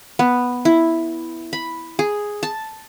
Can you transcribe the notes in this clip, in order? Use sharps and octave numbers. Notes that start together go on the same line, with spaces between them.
B3
E4
B5
G#4
A5